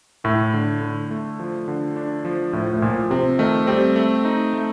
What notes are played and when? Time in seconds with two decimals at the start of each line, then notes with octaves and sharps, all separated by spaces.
0.24 A2 A3
0.54 D3
0.81 D3
1.11 A3
1.40 F3
1.68 D3
1.96 D4
2.25 F3
2.53 A2 F3
2.73 A2
2.82 A#2 F3
3.10 C3 C4
3.39 D#3 A3
3.67 G3 C4
3.96 A3
4.25 D#4
4.54 A3